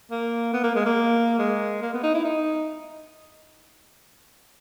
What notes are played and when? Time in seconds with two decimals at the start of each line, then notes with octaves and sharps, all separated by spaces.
0.11 A#3
0.53 B3
0.64 A#3
0.75 G#3
0.86 A#3
1.39 G#3
1.82 A#3
1.94 B3
2.04 D#4
2.15 E4
2.25 D#4